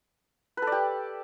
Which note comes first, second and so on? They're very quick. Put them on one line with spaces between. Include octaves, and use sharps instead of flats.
B4 A4 D5 G4